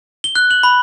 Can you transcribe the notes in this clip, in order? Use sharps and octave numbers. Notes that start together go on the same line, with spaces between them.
G7
F#6
F#7
B5